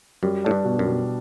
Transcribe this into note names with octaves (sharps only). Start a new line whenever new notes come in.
F#2 G3
A2 D4
G2
B2
F#2
B2